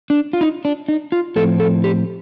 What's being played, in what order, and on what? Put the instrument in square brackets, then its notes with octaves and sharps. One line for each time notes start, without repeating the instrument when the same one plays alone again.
[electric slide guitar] D4
F4
D#4
D4
D#4
F4
A2 F3 C4 A4
A4
G4